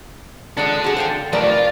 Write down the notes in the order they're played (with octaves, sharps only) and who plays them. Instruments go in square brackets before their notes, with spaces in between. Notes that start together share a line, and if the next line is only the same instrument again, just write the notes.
[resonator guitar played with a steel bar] F3 G#3 D4 [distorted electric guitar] A4 F#5
[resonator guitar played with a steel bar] F#4 G#4
C5 F5 G5
[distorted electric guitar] F3 A3 [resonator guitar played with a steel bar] A#4 B4 D5
[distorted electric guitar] F4